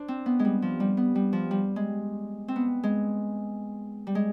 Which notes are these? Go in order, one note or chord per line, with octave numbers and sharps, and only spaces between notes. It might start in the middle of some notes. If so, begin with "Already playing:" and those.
Already playing: D4 C5
C4
B3
G#3
G3
F3
G3
B3
G3
F3
G3
G#3
C4
B3
G#3
G3
G#3